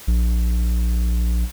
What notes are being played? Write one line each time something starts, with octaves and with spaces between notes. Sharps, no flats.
A#1